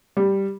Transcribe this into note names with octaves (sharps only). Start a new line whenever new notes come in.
G3